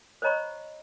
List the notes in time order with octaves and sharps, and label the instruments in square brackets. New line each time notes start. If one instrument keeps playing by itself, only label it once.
[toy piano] C5 C#5 D#5 A#5 B5 C#6